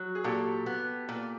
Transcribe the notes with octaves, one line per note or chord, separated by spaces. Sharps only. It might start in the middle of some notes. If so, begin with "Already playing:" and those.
Already playing: F#3
G#4
A#2 G4 A4
B3
A#2